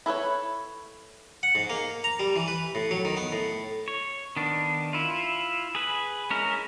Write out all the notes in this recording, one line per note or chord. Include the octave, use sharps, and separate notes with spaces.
E4 A4 B4 C#5
F#5
G#2
A#3
A#5
G3
E3
B4
A2
F#3
D#3
B3
A2
C#5
D#3 B3 D4
E4 F4
G#4 B4
G#3 C#4 E4 A#4